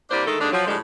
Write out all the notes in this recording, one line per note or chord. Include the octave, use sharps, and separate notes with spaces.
C3 G3 A#3 D4 E4 C5
D3 D#3 G#3 A3 A4
D#2 D3 G#3 D4
F3 F#3
A2 D3 F3 G3 G#3